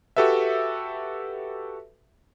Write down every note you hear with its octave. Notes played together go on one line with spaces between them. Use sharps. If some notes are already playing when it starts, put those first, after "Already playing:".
F#4 G4 A4 B4 E5